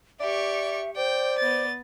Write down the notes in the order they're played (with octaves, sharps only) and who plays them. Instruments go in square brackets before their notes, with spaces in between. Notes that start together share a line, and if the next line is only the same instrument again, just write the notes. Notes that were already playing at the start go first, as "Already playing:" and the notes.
[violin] G4 C#6 [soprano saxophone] D5 [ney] E5
[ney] C5 [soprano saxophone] D5 [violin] G5
[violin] B3 A6